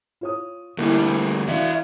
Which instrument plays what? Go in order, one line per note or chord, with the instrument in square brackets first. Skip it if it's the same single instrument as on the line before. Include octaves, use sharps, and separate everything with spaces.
[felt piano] F4 C#5 D#6
[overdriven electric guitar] D2 G3 [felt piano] A#3 E4
[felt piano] E3 D5 F5 [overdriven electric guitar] F#4 E5